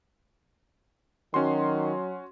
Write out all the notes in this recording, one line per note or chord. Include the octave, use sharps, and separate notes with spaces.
D#3 F#3 C#4 F#4 C6